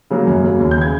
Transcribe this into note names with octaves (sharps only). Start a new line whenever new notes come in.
C#3 F#3 A#3
F#2
C#3 F#3 A#3
D#2
G6
C#3 E3 G#6